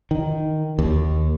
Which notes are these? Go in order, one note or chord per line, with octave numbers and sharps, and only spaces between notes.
D#3
D#2